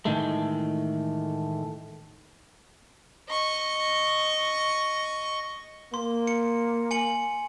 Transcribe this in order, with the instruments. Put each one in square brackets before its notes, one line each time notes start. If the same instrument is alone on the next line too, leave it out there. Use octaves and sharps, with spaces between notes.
[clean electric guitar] A2 D#3 E3 G#3 A3
[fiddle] D#5 C#6
[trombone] A#3 [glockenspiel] C6
[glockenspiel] C#7
G#5 C#7 F#7